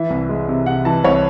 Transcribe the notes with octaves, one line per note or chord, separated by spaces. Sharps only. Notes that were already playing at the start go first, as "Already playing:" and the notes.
Already playing: E3 E5
C2
G#3
C3
C3 F#5
E3 A5
C2 C#5